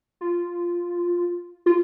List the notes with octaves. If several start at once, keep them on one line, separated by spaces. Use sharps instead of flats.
F4
F4